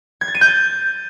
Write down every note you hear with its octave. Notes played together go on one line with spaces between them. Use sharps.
G#6
A6
D#7
G6
A6